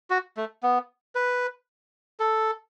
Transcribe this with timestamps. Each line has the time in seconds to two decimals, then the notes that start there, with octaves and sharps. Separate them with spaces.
0.10 F#4
0.37 A3
0.63 B3
1.15 B4
2.20 A4